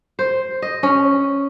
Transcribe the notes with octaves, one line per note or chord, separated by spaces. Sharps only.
C5
D#5
C#4